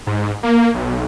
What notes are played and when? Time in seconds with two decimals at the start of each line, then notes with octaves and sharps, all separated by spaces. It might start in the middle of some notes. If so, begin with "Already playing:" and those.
0.07 G#2
0.43 A#3
0.74 B1